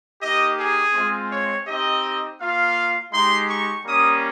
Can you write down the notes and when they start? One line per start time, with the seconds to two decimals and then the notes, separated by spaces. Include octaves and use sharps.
0.21 A#3 D#4 G4 D#5
0.57 G#4
0.94 G#3 C4 F4
1.30 C#5
1.66 C4 D#4 G4 D#5
2.39 A#3 F4 F5
3.12 G#3 D#4 G4 C6
3.48 C#6
3.84 G3 A#3 C#4 D#6